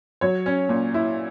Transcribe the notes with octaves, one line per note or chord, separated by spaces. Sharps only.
F#3 C#5
C#4
A#2
E4